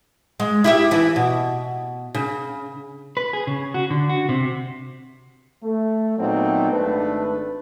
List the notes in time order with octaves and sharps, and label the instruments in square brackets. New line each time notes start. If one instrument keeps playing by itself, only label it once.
[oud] G#3
E4 G4 E5
E3 E4
B2
C#3
[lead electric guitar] B4
G#4
C#3
F#4
D3
F#4
C3
[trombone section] A3
A#2 F#3 A3 B3 C4 D#4
G#1 A3 D4 B4